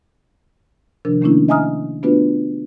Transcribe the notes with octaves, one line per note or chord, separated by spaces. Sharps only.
C3 D#3 F3 D4 A#4
D#3 A3 A#3 C#4 D4 E4
D#5 E5 G#5 A#5 D#6 F6
A3 B3 D4 F4 F#4 B4